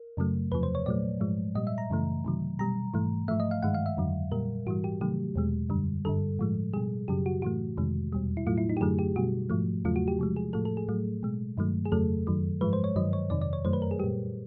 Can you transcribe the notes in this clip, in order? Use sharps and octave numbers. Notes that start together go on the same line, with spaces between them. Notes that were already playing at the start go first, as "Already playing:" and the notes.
Already playing: A#4
F#2 C#3 F#3 A3
E2 C3 F3 B4
C5
C#5
A#2 F#3 A3 D5
G#2 F3 G#3
A#2 G3 D#5
E5
A#5
F#2 C#3 E3 A3
C3 D#3 F#3
B2 G3 A#5
G#2 E3 A3
G#2 F3 A3 E5
D#5
F5
G2 D#3 G#3 F#5
F5
E5
F2 D3 F#3
A#2 G3 A#4
G#2 E3 G3 F#4
G4
C3 D#3 F#3 A3 G4
E2 B2 G#3
F#2 D3 G3
G2 D3 G3 A4
A2 F3 G#3
B2 G3 G#4
F#2 C#3 F#3 G4
F#4
A2 E3 A3 F#4
F2 C3 D#3 G#3
E2 B2 G3
E4
A2 F#3 A3 F4
E4
D#4
G4
F#2 D3 F#3 A3 G#4
G4
B2 G3 F#4
G#2 F3 A3
E2 C#3 F#3 A3 F4
F#4
G4
C3 F3 G#3
G#4
A2 F3 A3 A4
A4
G#4
A2 F#3 A3
B2 G#3
G2 D#3 F#3 A3
G#4
F2 C#3 F#3 A3 A4
F#2 D#3 F#3
G#2 F3 G#3 B4
C5
C#5
G2 D#3 F#3 D#5
C#5
F2 C3 D#3 D5
D5
C#5
F#2 D#3 F#3 A3 C5
B4
A#4
G#4
A#2 G3 G4